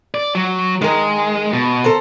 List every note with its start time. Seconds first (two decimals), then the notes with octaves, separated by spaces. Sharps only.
0.14 D5
0.35 F#3
0.82 D#3 G#3 A#4
1.53 B2
1.84 A4 A#4 C5